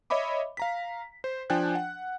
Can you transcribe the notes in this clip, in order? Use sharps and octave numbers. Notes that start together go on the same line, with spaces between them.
C#5 D#5 E5 B5 D6
F5 A#5 B6
C5
F3 D4 G5 G#5 F#6
F#5